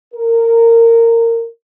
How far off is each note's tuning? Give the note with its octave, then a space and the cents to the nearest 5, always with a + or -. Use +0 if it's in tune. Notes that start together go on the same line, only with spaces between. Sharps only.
A#4 -20